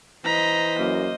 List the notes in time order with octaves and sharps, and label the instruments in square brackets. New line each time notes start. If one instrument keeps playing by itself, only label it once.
[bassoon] E3 [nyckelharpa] C5 D#5 [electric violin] A#5 B6
[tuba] F#2 [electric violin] A#3